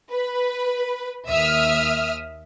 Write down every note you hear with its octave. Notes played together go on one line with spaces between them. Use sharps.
B4
D#2 E5 D#6 F6